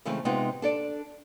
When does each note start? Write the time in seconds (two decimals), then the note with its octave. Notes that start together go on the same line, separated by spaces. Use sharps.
0.05 C#3 E3 G#3 A3 C4
0.25 C3 G#3 B3 C4 D#4 F4
0.62 D4 A4 D5